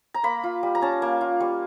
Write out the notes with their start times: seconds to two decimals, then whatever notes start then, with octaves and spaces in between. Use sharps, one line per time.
0.14 A#5
0.24 A#3 B5
0.44 F4
0.63 G3
0.75 A#5
0.82 C#4 A5
1.02 A#3
1.21 F4
1.40 G3 C#6